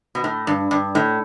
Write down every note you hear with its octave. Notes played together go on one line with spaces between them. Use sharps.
B2
A2
G2
G2
A2